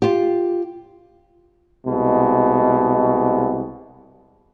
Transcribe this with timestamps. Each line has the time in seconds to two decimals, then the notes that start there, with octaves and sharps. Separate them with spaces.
0.02 F4 G4
1.86 C2 B2 G#3